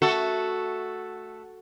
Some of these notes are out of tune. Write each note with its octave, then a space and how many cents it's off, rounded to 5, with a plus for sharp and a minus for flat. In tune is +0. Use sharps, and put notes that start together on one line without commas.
A3 +0 F#4 +0 A4 +0